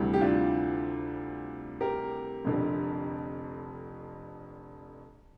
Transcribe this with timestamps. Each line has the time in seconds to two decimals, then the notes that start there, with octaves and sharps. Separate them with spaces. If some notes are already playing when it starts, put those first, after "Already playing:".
Already playing: D2 C3 E3 G3
0.14 G4
0.21 D4 F4
1.81 G4 A#4
2.45 F1 F2 D3